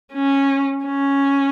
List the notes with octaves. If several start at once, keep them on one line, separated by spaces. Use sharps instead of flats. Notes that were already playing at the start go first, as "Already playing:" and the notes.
C#4
C#4